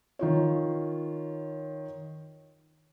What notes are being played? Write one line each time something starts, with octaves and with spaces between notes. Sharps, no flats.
D#3 F4 C#5